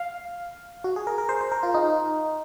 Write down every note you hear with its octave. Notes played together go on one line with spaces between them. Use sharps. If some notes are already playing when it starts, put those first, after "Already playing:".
Already playing: F5
F#4
G#4
A#4
A#4
C5
C5
A#4
F4
D#4